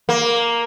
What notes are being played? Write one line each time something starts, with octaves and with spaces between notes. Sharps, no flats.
A#3